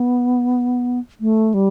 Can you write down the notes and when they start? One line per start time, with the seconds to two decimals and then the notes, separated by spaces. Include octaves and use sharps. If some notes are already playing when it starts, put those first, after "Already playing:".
Already playing: B3
1.21 A3
1.54 G3